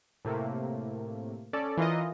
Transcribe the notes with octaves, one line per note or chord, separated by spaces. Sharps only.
A2 C3 A3 A#3
C#4 A4 D5 A5
E3 F4 A#4 D#5